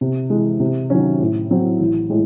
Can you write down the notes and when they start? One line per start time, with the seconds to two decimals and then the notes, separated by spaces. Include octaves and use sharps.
0.01 C3
0.30 E3 G#3
0.60 C3
0.90 D#3 F#3 C#4
1.20 A2
1.51 F#3 C4
1.80 A1
2.10 A2 G#3